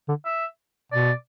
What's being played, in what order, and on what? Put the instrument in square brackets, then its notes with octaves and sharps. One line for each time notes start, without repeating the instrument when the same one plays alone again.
[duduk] D3
[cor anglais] E5
[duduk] B2 [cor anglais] D5